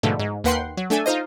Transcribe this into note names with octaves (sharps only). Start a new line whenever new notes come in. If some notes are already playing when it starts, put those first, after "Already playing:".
G#2 B2 D3 F3 A3
G#2
D#2 A#3 B4 F#5 G5 C6
F#3
A3 D4 A4 G#5
D#4 F4 C5 D#5